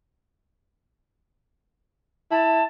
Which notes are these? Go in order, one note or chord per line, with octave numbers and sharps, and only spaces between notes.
E4 A5